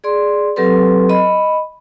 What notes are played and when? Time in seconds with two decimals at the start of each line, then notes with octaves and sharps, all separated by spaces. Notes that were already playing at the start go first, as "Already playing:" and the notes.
0.04 G#4 D5 C6
0.56 F#3 C4 G4 A4 B4 C6
1.09 D#5 B5